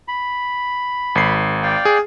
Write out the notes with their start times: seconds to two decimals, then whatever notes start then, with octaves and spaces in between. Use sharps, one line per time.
0.08 B5
1.15 G#1 C7
1.63 D5 F5 G5
1.85 G#4